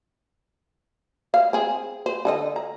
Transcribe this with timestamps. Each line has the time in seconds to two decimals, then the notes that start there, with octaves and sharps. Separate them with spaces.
1.34 F5
1.53 C4 G#4
2.06 C5
2.25 D3 A4 D#5
2.56 A#5